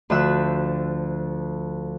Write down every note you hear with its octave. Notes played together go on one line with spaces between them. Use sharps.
D2 D3 F3 E5 E6 F#6